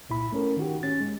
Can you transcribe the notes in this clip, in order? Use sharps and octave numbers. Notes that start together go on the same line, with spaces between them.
C2 A#2 E4 B5
A3 C#4 A#4
D#3 F#4 G4
C#4 A6
G#3